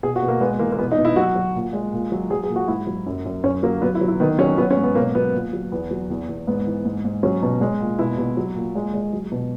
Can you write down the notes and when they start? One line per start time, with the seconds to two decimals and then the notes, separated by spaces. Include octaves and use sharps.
0.03 B2 G#4
0.16 F#4
0.22 B2
0.28 A#3
0.41 G#3 B3
0.59 E3 A#3
0.72 A#3
0.78 B2 B3
0.92 D#4
0.98 B2
1.05 E4
1.16 F#3 F#4
1.35 F#3
1.55 A#2
1.73 G#3
1.93 A#2
2.12 F#3
2.30 F#3 G#4
2.43 G#4
2.49 A#2
2.56 F#4
2.68 G#2 E4
2.87 F#3
3.06 F#2
3.25 F#2
3.44 F#2 C#4
3.63 F#3 A#3
3.82 F#3 B3
3.95 E4
4.01 F#3
4.08 E4
4.20 D#3 B3
4.38 F#3 C#4
4.58 F#3 B3
4.71 C#4
4.77 G#2
4.83 B3
4.95 B2 A#3
5.15 F#3 B3
5.33 A#2
5.53 F#3
5.72 E2 B3
5.91 F#3
6.10 E2
6.29 E2
6.47 G#2 B3
6.66 E3
6.85 G#2
7.05 G#2
7.23 F#3 C#4
7.42 B2
7.61 G#3
7.81 A#2
7.99 B2 E4
8.18 B2
8.37 F#3
8.55 A#2
8.75 G#3
8.94 G#3
9.13 F#3
9.32 B2